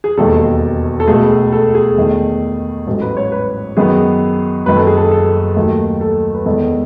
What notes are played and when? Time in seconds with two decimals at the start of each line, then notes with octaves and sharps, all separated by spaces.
0.04 G#4
0.17 E1 D#2 D#3 A4
1.00 A4
1.07 C#2 B2 A3 G#4
1.52 A4
1.75 G#4
1.97 E2 D#3 A3
2.87 A1 G#2 F#3 A4
3.01 B4
3.17 C#5
3.32 B4
3.77 F#2 D#3 F#3 B3 G#4
4.66 F#1 F#2 D#3 B4
4.76 A4
4.87 G#4
4.97 A4
5.05 G#4
5.11 A4
5.56 D#2 D#3 F#3 A3
6.01 A4
6.34 B4
6.46 E2 D#3 G#3 B3 A4